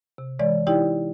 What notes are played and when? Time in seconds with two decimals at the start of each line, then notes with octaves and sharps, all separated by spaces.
0.18 C3
0.39 E3 G#3 C#5 D5
0.67 D#4 E4 G4 D5 G5